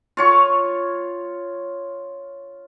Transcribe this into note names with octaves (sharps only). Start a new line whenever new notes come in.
F4 C#5 C#6